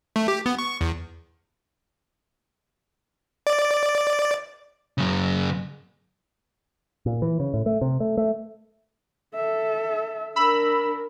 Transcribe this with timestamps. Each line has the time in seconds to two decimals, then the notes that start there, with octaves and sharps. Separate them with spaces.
0.16 A3
0.28 G4
0.46 B3
0.59 C#6
0.81 E2
3.47 D5
4.98 F#2 C#3
7.06 A#2
7.22 E3
7.40 C#3
7.54 A2
7.66 A3
7.81 C3
8.00 A3
8.17 A3
9.35 A4 E5
10.36 D4 A#4 B5 E6